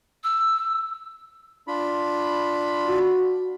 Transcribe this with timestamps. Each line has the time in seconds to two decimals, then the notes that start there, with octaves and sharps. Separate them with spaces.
0.24 E6
1.68 D4 F4 B5
2.87 F#4